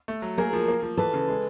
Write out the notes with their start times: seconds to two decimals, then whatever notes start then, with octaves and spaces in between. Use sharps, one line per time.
0.08 A3
0.22 F#3
0.38 A#3 G#4 A#4
0.53 F3
0.68 A#3
0.82 F3
0.97 E3 A4 B4
1.14 C#3
1.28 G#3